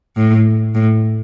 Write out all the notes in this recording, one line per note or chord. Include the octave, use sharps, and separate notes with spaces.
A2
A2